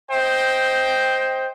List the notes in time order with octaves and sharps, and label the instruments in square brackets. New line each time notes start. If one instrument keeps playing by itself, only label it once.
[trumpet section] C5 D#5 G5